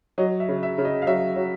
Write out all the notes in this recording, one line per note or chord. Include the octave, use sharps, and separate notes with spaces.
F#3 D#5
E5
C#3
E5
C#3
D#5
F5
F#3 E5
F#3